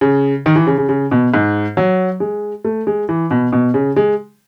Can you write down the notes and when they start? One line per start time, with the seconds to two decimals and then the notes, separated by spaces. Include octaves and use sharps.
0.01 C#3
0.46 D#3
0.56 E3
0.67 C#3
0.78 C#3
0.89 C#3
1.11 B2
1.34 G#2
1.77 F#3
2.20 G#3
2.64 A3
2.87 G#3
3.09 E3
3.31 B2
3.53 B2
3.74 C#3
3.96 G#3